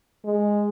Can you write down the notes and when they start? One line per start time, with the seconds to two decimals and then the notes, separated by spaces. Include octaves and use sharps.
0.25 G#3